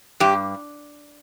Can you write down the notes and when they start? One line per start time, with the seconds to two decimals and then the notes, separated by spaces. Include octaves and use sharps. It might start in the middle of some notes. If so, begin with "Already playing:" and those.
0.20 G2 G4